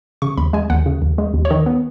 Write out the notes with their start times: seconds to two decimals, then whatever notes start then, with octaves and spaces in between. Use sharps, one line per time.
0.22 C#3 C#6
0.37 D#2 B5
0.53 G#3 G#5
0.70 D#2 F#5
0.86 C#3
1.02 D#2
1.18 G#3
1.34 D#2
1.45 C#5
1.50 D#3 D#5
1.66 B3